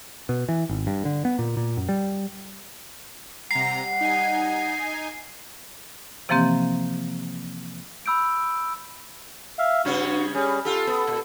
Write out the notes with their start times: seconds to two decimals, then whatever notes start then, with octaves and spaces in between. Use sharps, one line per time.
0.29 B2
0.49 E3
0.69 G#1
0.87 G2
1.05 D3
1.25 B3
1.39 A#2
1.57 A#2
1.77 F#2
1.89 G3
3.51 C3 G3 F#5 A#5 C7
4.01 D#4 G#5
6.29 C3 E3 F3 A#3 C4 G4
8.06 B5 E6 G6 D7
9.59 E5 F5
9.85 G2 C#3 C#4 F#4
10.34 G3 C#4 G#4
10.65 F4 G4 A4
10.87 B3
11.07 A#2